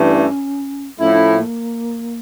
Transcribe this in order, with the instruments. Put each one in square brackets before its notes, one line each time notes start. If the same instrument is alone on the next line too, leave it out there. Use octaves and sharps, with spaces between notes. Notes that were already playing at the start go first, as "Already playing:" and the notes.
Already playing: [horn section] G2 E3 A3 [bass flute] C#4
[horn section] A2 F3 A3 E4 [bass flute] C#4
[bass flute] D4
C#4
A#3